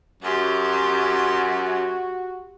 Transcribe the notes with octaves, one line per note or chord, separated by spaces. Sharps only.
F#2 F#4 G4 C6